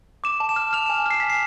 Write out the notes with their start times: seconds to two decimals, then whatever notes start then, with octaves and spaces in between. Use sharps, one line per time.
0.24 D6 E7
0.40 A5
0.49 E7
0.56 F6
0.73 F6 F7
0.86 E7
0.90 G#5
1.06 F6 C7
1.20 G#5 B6
1.30 C7